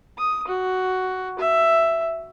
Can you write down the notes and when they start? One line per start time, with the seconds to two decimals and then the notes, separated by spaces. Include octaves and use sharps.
0.18 D#6
0.47 F#4
1.39 E5